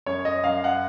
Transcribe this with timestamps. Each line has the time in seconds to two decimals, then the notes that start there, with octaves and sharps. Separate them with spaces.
0.06 F#2 C#5
0.25 D#5
0.44 F#2 F5
0.64 F#5